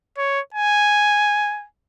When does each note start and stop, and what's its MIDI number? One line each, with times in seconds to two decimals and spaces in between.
0.18 0.40 73
0.54 1.66 80